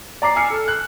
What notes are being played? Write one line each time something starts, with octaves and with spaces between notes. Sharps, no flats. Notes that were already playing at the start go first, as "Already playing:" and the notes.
D5 A#5 D6 C7
G#5 E6 F6 C7 C#7
A4
F#6